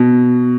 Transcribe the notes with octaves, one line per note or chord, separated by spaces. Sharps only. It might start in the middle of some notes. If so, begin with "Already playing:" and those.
Already playing: B2